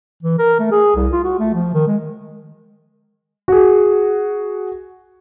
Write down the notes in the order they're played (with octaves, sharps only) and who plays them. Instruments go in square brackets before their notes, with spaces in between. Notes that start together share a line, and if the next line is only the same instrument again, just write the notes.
[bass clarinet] E3
A#4
A3
G#4
C2
F4
F#4
A3
F3
D#3
G#3
[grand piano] F#4 G#4